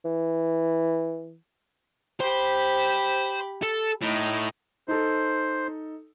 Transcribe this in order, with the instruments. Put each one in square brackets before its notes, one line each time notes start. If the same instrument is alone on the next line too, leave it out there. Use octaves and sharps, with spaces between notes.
[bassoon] E3
[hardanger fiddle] G4 B5 [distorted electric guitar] C5
[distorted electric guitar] A4
[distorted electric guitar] A2 [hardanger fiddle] D#4
[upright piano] D#4 A4 [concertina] C5